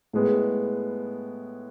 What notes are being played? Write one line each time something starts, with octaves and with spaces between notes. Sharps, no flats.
A2 G#3 B3